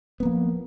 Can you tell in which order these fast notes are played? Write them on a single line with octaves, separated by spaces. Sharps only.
B3 A#3 F3